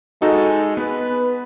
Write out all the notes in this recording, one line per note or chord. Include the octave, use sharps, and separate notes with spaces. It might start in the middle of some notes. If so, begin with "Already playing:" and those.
G#3 D#4 F#4 A4
B3 B4